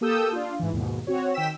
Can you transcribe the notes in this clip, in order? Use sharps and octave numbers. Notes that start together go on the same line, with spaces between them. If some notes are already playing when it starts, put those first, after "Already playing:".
A#3 G4 A4 D#6 E6 G6
D4 F4
G#2 E3
D#2 G#2 B2
C4 F#4 C#5
D#3 G5 E6 B6 E7